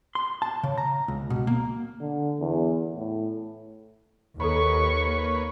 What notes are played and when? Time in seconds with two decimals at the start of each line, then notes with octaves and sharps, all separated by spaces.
0.15 C6
0.42 A5
0.63 C#3
0.78 A#5
1.08 C#2
1.30 B2
1.47 A#3
2.01 D3
2.40 E2
2.95 A2
4.40 D#2 A#3 A4 B4 C#5 A#5 B5 C#6